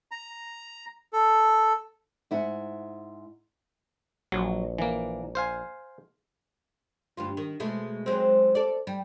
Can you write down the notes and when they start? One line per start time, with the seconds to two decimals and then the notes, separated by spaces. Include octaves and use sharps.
0.11 A#5
1.13 A4
2.31 G#2 E4 F#5
4.32 A#1 F#3
4.78 E3 A#3
5.35 C5 F5 G#5
7.17 D2 G2 F4
7.37 D#3
7.60 B2 G#3 A3
8.06 F#3 G#3 C4
8.55 A4 D5
8.87 G3